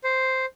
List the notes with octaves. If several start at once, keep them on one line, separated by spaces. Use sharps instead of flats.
C5